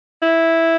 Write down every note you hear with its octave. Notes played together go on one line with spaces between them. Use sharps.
E4